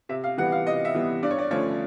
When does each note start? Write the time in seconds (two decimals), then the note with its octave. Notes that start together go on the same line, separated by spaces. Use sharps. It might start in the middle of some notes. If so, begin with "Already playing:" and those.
0.09 C3 E5
0.24 F5
0.38 E3 G3 B3 F#5
0.52 F5
0.66 C3 D#5
0.85 E5
0.94 E3 G3 B3
1.23 G2 D5
1.31 C#5
1.39 D5
1.51 D3 F3 A3 C#4 C#5